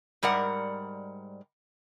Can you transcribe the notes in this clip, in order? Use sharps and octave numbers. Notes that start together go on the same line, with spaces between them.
G#2 G3 A#4 D5 F#5